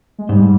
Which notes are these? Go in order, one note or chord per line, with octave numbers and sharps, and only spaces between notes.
G#3
G#2 G3